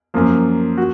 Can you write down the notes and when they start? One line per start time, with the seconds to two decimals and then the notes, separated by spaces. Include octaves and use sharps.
0.14 F#2 F3 A#3
0.78 F#4